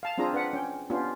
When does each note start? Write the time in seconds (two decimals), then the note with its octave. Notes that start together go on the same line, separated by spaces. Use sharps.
0.03 F5 A5
0.18 C4 D4 F4 G#4 A#5
0.33 D4 B4 F#5
0.53 C#4 G5
0.90 B3 C#4 D4 F4 G4